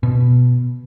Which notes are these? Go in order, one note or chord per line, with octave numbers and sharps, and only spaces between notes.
B2